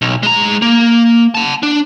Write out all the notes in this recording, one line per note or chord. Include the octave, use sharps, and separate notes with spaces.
B1
G#3 A#5
A#3
F#5 A5
D4